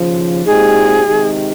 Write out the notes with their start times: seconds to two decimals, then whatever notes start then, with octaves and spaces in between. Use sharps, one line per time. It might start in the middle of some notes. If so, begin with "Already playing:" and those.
Already playing: D#2 C#3 F3
0.46 A#2 G#3 C4 D#4 G4 G#4
1.05 C3 D#3 G#3 D#4 G4